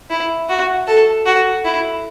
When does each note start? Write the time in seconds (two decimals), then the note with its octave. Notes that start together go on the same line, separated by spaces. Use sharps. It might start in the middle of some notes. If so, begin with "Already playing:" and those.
0.11 E4
0.49 F#4
0.88 A4
1.26 F#4
1.65 E4